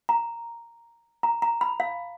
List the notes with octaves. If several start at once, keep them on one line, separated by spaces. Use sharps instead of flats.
A#5
A#5
A#5
B5
F5